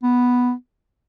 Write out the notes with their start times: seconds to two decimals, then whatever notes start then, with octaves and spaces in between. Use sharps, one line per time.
0.03 B3